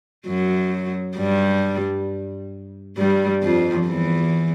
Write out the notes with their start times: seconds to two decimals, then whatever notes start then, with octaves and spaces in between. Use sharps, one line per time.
0.27 F#2 F#3
1.17 G2 G3
2.97 G2 G3
3.43 F2 F3
3.88 E2 E3